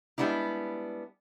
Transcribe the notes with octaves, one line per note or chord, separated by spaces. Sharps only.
G3 G#3 B3 D4 E4